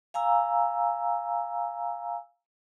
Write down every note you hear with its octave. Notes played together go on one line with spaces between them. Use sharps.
F5 G#5 A#5 E6